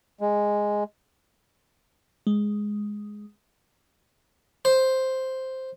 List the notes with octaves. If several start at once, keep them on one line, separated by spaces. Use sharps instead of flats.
G#3
G#3
C5